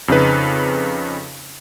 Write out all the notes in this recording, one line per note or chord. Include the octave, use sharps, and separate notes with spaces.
F2 C#3 D#4 B4